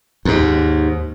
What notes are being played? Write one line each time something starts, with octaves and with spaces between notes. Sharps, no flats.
D#2 G#2